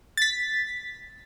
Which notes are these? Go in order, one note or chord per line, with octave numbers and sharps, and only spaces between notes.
A6 B6